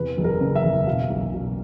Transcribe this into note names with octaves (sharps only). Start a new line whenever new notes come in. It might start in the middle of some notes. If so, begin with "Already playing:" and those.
Already playing: E2 C3 B4
F#1
A#4
C#3
E5
E2
B2 F5
B1
B2